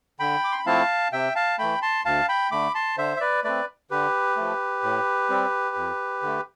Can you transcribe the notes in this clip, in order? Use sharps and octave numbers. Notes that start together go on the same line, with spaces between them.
D3 G5 B5
D6
C6
B5
F3 A3 C4 E4 F5 A5
C3 E5 G5
F5 A5
E3 A3 G5 B5
A5 C6
D2 F5 A5
G5 B5
D3 A3 B5 D6
A5 C6
D3 C5 E5
E5
B4 D5
A3 C4 B4 D5
D3 G4 B4
F3 A3
A2
G3 C4
F2
D3 A3